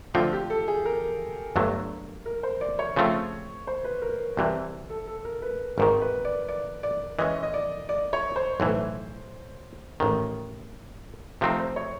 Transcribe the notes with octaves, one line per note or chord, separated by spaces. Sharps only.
D3 F3 A3 C4 F4
G4
A4
G#4
A#4
G1 G2 D3 F#3 A3
A#4
C5
D5
C#5
C#3 F3 A3 C4 F4
C5
B4
A#4
C2 C3 E3 F#4
A4
A4
A#4
B4
G#1 G#2 D#3 A#4
B4
D5
D5
D5
E3 G#3 C#4 D#5
D#5
D5
D5
C#5
C5
B1 A2 E3 C5
A1 G#2 D#3
C3 F3 A3 C4 D#4
C5
C#5